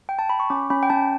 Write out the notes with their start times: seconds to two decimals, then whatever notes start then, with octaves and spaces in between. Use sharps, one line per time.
0.09 G5
0.19 A5
0.30 B5
0.40 C#6
0.50 C#4 D6
0.70 C#4 B5
0.83 G5
0.90 C#4 A5